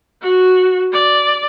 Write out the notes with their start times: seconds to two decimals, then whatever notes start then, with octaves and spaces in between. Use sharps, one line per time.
0.22 F#4
0.93 D5